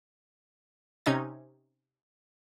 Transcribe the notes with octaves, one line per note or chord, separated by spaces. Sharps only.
C3 C#4 D#4 G#6